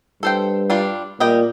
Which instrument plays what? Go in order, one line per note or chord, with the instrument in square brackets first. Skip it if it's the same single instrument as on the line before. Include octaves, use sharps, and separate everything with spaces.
[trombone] G2 [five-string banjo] A4 C5 G5
[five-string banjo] G3 D4 F4
[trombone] A#2 [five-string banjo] G3 D#5 G5